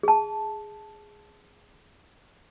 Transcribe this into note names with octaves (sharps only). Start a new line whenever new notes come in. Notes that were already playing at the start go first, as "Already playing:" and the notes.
G#4 A5